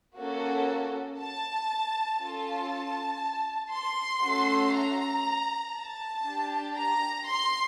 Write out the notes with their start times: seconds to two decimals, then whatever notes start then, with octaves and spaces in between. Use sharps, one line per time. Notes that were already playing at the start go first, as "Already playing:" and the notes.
0.17 A#3 C#4 F#4 A4
1.19 A5
2.19 C#4 F4 A4 A5
3.72 C6
4.22 A3 C#4 F#4 A4
4.73 A#5
5.74 A5
6.25 D4 G4
6.75 A#5
7.27 C6